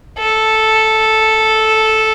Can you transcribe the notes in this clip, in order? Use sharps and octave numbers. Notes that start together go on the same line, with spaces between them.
A4